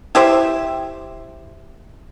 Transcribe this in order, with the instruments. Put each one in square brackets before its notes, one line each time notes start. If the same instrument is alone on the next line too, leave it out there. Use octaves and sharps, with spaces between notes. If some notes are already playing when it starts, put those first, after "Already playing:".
[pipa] E4 G4 C5 E5